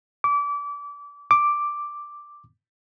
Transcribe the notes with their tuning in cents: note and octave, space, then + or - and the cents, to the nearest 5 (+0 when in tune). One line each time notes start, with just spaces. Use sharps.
D6 -30
D6 +0